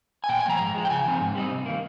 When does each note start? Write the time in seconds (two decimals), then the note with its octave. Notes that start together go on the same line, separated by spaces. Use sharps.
0.24 G#5
0.29 A#2 G5
0.39 G#5
0.45 F3 A#3 A#5
0.60 G#2
0.75 F3 G#3
0.85 G5
0.90 C#3 G#5
1.06 F3 C4 D#4
1.21 G#2
1.35 G3 C4 D#4
1.51 C3
1.66 D#3 A#3